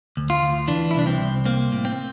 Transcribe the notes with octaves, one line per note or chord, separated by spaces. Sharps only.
D2
F4
D2
E3 D4
E4
C2 D4
C4
C2
A#3 C4
A2
C4